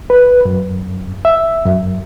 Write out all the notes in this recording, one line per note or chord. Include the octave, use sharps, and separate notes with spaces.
B4
F#2
E5
F#2